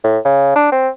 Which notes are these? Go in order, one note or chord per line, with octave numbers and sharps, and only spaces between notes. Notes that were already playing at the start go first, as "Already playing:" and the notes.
A2
C#3
D4
C4